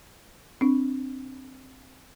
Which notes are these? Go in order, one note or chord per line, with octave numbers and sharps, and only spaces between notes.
C4 D4